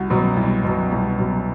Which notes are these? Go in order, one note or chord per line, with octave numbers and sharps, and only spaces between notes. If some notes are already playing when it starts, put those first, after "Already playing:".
Already playing: C2 F#4
B2 F#3
C2
B2 F#3
C2
B2 F#3